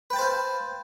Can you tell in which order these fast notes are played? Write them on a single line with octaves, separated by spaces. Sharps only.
B4 G5 A5 C5 F5